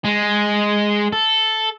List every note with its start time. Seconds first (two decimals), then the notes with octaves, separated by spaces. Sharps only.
0.05 G#3
1.13 A4